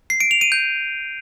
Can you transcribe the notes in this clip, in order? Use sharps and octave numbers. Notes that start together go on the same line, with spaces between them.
C7
D7
F7
D#7
G6